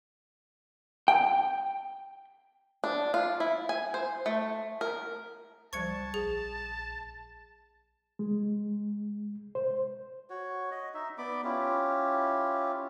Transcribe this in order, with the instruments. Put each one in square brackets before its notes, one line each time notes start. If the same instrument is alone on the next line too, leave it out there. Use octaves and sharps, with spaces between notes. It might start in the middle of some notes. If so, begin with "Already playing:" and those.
[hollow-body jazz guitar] G5
[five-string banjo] D4
F4
E4
G#5
C5
A3
A#4
[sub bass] C#2 [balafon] F3 G3 C5 [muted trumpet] A5 [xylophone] C#6 G#6 C#7
[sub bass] A#1 [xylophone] G#4
[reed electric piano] G#3
C5
[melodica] F#4 C#5
D#5
D#4 E5
B3 D5 B5 D6
C#4 E4 F4 G4